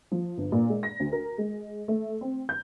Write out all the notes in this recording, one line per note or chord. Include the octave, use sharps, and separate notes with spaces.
F3
G1
A#2
G#3
A#6
D2
A#4
G#3
A3
C4
G6